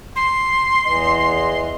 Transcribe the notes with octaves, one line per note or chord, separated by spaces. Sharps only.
C6
E2 E3 D#5